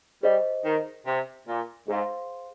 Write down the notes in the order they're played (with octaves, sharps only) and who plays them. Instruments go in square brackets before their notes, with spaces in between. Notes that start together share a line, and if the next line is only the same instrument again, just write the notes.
[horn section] G3 [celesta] G#4 C5 D#5
[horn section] D#3
C3
A#2
[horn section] G#2 [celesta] G#4 C5 F5 C6